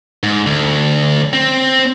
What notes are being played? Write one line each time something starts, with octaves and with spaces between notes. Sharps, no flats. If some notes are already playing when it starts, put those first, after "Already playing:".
G#2
D2
C4